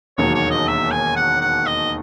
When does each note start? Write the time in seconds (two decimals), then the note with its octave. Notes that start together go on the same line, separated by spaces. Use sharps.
0.18 E1 D#2 D#3 F#3 C#5
0.34 C#5
0.50 D#5
0.67 E5
0.91 G#5
1.16 F#5
1.41 F#5
1.66 D#5